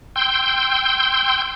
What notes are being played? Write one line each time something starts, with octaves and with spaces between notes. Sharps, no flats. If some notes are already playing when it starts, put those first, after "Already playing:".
G5 C6 E6 G6